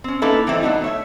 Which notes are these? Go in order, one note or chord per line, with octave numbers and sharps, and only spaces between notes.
C4 C#4
A#3 C#4 D#4 E4 A4 B4
E3 G3 A3 C4 D#4 E4
F#3 B3 D4 D#4 F#4
A3 C#5 E5